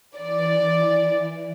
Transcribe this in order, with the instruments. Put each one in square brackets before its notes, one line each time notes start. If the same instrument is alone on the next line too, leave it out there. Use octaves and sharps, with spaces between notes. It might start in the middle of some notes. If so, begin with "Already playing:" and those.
[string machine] E3 [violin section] D5